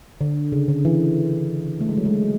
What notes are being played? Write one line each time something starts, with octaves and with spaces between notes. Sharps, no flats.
D3
C#3
D3
E3
A3
G#3
F#3
G#3